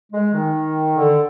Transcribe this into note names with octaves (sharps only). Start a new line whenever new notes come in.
G#3
D#3
D3